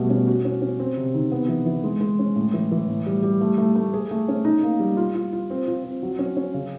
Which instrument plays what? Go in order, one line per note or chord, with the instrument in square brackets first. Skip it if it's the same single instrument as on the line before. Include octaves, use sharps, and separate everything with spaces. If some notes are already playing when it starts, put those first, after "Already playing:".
Already playing: [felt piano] B2 G3 A3
C#4
F#4
C#4
C#4
C4
C3
D#3
B3
E3
E3
G#3
G#3
C#4
A2
E3
E3
A2
G3
G3
A3
A3
A3
G#4
A3
C#4
D#4
A#3
G3
F4
F4
F4
C4
F4
C4
F#3
C#4
C#4
C#3